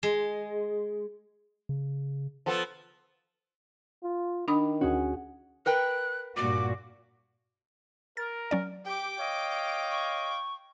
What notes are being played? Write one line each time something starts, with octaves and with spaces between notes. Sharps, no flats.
G#3
C#3
F3 B3 A4
F4
D#3 D4 B5 D#6
D2 C#4 F#4 G#4
A#4 B4 G5 F#6
G2 A#2 F#4 D6
A#4 A6
F#3 C#4 D5
G4 G5 D6
C#5 D#5 F5
C#6